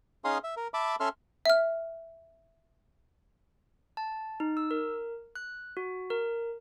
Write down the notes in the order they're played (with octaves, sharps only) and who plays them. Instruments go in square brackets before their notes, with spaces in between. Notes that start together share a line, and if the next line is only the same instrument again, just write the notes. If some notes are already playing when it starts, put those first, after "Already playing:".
[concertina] C#4 D#4 G#4 F5 C6 D#6
E5
A#4
E5 A5 B5 D6
C#4 A4 E5 C6 F6
[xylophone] E5 F6
[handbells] A5
D#4
E6
A#4
F#6
F#4
A#4